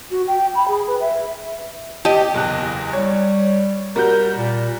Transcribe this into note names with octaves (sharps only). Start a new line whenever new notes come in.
F#4
G5
B5
G#4
B4
E5
G4 D#5 A5
F#1 E2 F#6
G3 C#5
G3 F#4 A#4 G6
A#2